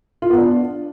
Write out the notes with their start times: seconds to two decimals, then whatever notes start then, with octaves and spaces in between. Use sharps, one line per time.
0.22 F4
0.30 B3
0.38 D4